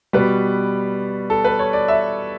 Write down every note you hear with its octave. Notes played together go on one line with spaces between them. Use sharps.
B2 G3 B4
A4
B4
C#5
D5
E5